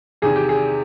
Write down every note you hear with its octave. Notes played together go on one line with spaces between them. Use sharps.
E2 C3 D#3 G#4
G4
G#4